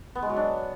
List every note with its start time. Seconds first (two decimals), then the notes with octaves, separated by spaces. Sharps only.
0.15 B3
0.22 G#3
0.29 F#3
0.37 D4